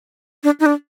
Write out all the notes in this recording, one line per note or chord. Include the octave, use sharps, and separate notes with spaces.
D4
D#4
D4